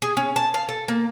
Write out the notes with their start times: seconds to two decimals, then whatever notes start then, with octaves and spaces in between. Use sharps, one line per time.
0.02 G#4
0.17 C#4
0.36 A5
0.54 F5
0.69 A4
0.88 A#3